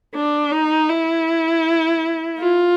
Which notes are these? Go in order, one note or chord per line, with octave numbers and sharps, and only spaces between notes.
D4
D#4
E4
F4